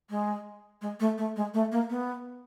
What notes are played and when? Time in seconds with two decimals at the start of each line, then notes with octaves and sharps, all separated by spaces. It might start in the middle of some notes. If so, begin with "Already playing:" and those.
0.10 G#3
0.82 G#3
1.00 A3
1.18 A3
1.36 G#3
1.54 A3
1.72 A#3
1.90 B3